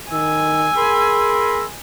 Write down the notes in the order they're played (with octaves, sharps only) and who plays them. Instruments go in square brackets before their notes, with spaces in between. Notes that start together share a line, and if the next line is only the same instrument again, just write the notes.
[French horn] D#3 [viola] G#5 [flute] E6
[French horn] G#4 [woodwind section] A#4 B5 C6